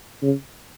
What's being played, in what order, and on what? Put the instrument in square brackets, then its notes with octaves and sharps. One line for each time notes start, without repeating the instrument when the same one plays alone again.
[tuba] C#3